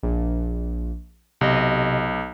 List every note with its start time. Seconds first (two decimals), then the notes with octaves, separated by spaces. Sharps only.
0.03 A#1
1.41 B1 C3 D#5